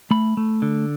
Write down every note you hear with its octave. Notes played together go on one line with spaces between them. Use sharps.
A3 B5
A3
D3